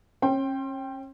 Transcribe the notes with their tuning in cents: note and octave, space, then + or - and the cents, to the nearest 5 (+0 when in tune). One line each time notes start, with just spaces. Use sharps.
C#4 -35 G5 +0 C6 +25